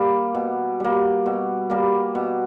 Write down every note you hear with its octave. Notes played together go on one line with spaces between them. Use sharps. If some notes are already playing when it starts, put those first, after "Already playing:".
Already playing: G3 A#3
B2
G3 A#3
B2
G3 A#3
B2